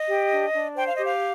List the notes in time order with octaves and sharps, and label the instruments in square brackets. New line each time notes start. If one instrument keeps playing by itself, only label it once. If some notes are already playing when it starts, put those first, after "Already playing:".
Already playing: [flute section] D#5
G4
D4
D4
C5 G5
F5
G4 D#5
F5